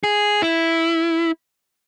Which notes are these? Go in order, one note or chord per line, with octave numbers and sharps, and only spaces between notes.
G#4
E4